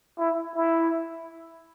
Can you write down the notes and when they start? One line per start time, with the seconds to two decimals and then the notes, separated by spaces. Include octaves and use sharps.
0.19 E4
0.56 E4